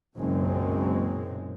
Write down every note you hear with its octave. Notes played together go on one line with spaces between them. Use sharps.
F#1 B1 F#2 A#2 G#3 C4